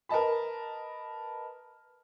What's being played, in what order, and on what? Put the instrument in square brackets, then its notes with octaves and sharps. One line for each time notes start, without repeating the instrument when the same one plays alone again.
[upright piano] A#4 B4 D#5 A5 B5